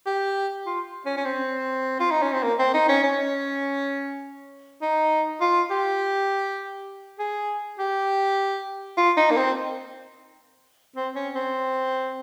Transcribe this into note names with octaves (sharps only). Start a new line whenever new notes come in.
G4
F4
C#4
C#4
C4
F4
D#4
C#4
C4
A#3
C4
D#4
C#4
C#4
D#4
F4
G4
G#4
G4
F4
D#4
A#3
C4
C4
C#4
C4